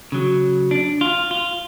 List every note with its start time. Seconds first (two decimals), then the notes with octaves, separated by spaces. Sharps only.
0.12 C#3 F#3
0.71 D4
1.01 F4
1.31 F4